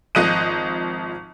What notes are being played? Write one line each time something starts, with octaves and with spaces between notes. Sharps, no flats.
G#1 F3 D#5 F#6 D#7